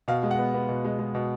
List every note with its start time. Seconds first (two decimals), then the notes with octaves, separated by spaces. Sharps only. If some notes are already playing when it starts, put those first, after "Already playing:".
0.08 B2 F5
0.23 G#3
0.31 F#5
0.39 B3
0.54 B3
0.69 B2
0.85 G#3
0.99 G#3
1.15 B2